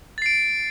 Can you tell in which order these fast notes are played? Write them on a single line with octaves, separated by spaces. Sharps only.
A6 C7 D7